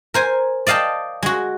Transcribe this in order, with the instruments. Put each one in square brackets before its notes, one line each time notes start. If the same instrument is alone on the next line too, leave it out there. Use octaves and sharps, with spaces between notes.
[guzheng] A#4 C5 G#5
D5 D#5 F5 G5 A5
G#3 F#4